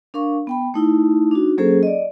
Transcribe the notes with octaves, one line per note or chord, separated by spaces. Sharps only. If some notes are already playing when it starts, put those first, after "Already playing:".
D4 A#4 F5 C#6
B3 G5 B5
A3 D#4 E4
D4 D#4 F#4
F#3 A#3 C#4 G#4 A4 C5
D5 D#5